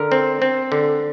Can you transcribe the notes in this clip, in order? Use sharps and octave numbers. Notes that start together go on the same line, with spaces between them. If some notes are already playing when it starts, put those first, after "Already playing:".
Already playing: D3 A#4
C4
C4
D3